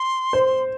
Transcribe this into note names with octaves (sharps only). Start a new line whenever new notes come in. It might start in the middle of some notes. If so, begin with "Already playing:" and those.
Already playing: C6
C5